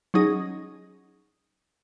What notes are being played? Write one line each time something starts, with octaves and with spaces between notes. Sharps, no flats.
F#3 C#4 D#4 G#4